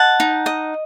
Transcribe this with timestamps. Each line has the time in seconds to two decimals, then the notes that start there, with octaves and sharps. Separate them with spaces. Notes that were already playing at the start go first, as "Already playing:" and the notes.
Already playing: D#5 F#5 A5
0.20 D#4
0.46 D#5